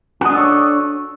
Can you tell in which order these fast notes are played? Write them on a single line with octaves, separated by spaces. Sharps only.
F#4 D#5 D4 A4 C#5